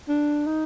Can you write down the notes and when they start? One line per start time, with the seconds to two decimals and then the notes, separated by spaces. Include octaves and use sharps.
0.08 D4
0.47 D#4